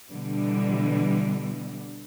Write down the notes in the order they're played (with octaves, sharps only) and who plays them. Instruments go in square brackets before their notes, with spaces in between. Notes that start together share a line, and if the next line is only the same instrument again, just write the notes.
[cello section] B2 D3 E3 G3